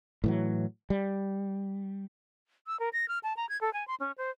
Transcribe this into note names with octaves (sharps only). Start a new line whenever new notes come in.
A2 E3 F#3
G3
E6
A#4
A#6
F6
A5
A#5
G#6
A4
G#5
C6
C#4
C5